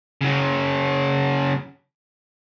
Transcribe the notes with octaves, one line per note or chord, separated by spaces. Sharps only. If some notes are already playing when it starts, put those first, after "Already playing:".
C#3 F#3